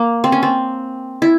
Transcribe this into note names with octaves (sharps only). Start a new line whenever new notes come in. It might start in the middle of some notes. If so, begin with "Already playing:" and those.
Already playing: A#3
C4
C#4
C4
E4